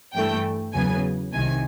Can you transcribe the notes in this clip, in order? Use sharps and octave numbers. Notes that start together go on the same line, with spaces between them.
G2 E3 A3 G5
E2 C#3 F#3 B3 G#5
C2 C3 D#3 G#5